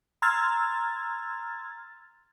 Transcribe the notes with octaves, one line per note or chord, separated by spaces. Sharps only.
A#5 C6 E6 F6 G#6 A6